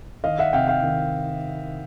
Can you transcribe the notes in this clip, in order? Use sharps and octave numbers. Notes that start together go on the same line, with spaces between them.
D#3 D#5 F5
E5 F#5
C3 F5 G5
F5 G5
D#3